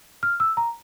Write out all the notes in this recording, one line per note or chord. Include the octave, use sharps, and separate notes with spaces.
F6
E6
A#5